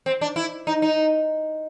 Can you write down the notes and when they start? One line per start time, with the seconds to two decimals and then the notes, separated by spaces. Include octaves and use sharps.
0.06 C4
0.21 D4
0.36 E4
0.67 D#4
0.82 D#4